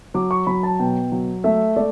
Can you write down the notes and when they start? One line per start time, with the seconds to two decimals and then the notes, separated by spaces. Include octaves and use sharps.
0.14 F#3 D6
0.31 C#6
0.47 F#3 B5
0.63 A5
0.79 B2 G5
1.12 F#3
1.44 A3 E5
1.76 A3 D5